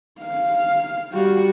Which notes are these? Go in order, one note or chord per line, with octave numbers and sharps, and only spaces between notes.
F5
G3 F#4